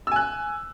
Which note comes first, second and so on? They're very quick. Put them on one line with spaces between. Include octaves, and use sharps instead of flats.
E6 G#5 F#6